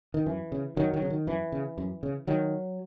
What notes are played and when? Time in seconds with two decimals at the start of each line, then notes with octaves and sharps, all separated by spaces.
0.14 D#3
0.26 F#2 E3
0.52 C#3
0.76 F#2 D#3 F#3
0.94 D#3 F#3
1.02 C#3
1.10 D#3
1.27 F#2 E3
1.52 C#3
1.78 F#2
2.03 C#3
2.27 D#3 F#3